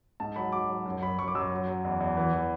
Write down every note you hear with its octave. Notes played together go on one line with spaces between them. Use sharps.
G#2 A5
F#3 B5
F#3 D6
F#3
F#2
F#2 B5
F#2 C#6
D6
F#2 E6
F#3
F#3
E2
E2
E3
E3